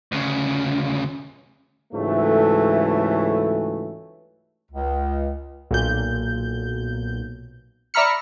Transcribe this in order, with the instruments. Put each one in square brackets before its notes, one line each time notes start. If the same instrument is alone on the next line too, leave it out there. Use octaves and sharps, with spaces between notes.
[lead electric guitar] D2 C#3
[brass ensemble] C#2 G#2 E3 F#3 A3
[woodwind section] C#2
[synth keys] B1 A#2 G6
D5 E5 A#5 B5 F6 C#7